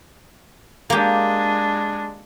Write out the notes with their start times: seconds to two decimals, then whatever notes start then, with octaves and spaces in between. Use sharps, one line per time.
0.90 G#3 A#3 D4 G4